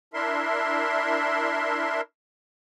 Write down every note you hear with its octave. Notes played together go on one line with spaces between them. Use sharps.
D4 E4 A#4 E5 C6